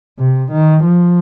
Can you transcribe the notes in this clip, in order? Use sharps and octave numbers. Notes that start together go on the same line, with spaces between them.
C3
D#3
F3